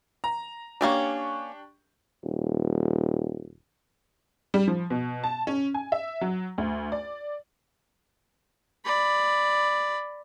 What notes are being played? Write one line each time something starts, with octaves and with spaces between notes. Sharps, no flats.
A#5
A#3 C#4 D4 G4 D5 C#6
D#1
G3
F3
B2
A5
C#4
G#5
E5
F#3
D2
D5
D5 B5